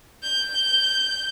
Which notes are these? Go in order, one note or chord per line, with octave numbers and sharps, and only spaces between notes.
G6